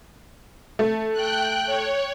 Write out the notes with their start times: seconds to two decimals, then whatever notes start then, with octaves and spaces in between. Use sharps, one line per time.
0.79 A3
1.13 G5 F#6
1.66 C#5